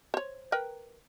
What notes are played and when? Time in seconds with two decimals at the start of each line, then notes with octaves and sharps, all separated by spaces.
0.14 C5 C#5
0.52 A#4 B4 G5